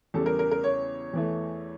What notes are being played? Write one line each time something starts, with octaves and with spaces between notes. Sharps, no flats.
E2 C#3 G3 A4
A#4
A#4
A#4
C#5
E2 E3 A3